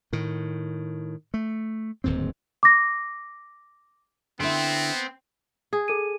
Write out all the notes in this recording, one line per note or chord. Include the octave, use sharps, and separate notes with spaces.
A2 D#3
A3
D1 D#2 G#2 C4
D6 A#6
D3 B3 C4 E4
G#4
A4 D#7